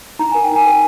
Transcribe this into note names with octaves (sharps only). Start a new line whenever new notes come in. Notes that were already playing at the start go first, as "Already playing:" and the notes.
D#4 A#5
A#4 G#5
G5
D#4 G#5
A#4